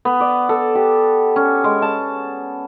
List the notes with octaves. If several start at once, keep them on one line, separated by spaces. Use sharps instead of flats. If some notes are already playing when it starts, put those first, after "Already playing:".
B3
D5
A4
G4
C#4
G#3
A5